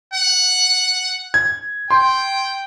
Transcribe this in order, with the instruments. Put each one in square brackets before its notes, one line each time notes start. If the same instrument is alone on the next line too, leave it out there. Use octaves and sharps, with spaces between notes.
[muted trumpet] F#5
[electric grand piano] G#6
[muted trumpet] G5 [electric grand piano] C6